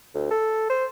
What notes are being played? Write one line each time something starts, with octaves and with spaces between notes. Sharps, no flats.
D2
A4
C5